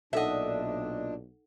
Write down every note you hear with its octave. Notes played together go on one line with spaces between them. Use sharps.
B1 A#2 D4 D#4 A4 D#5 E5 F#5